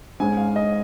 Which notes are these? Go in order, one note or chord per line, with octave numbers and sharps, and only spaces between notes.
G#2 G#3 C#4 G#5
F5
D#5